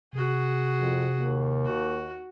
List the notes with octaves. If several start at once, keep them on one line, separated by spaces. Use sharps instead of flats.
C3 F#4 G#4
F2
D#2
F#4